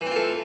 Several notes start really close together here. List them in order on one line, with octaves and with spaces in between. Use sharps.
E3 C4 F4 A3